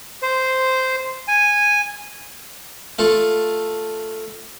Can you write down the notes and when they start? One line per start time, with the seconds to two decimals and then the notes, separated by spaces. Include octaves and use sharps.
0.22 C5
1.28 G#5
2.99 A3 F4 A4